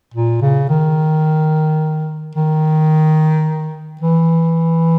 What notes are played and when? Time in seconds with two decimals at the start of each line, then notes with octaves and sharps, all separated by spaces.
0.14 A#2
0.42 C#3
0.69 D#3
2.35 D#3
4.01 E3